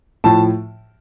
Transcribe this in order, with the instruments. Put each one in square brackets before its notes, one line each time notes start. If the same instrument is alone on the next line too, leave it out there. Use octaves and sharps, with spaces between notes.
[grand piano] A2 F3 A5